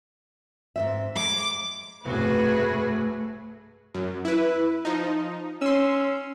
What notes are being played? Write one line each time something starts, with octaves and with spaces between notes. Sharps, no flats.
G#2 C4 E5
G#3 D6
F1 B1 G2 A3 F#4 G#4 B4
F#2
E4 B4
F3 D#4
C#4 C6 E6